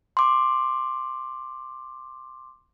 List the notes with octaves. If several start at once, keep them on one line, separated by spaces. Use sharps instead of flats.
C6 D6